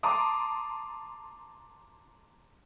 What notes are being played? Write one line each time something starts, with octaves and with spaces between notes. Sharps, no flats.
A5 A#5 C6 D6 D#6